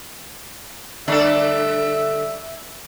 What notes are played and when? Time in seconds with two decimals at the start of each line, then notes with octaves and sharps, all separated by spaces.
1.08 D3 G3 A3 D4 A4 E5